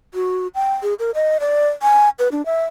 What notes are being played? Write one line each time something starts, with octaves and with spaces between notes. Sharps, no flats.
F#4
G5
G#4
A#4
D#5
D5
G#5
B4
D4
E5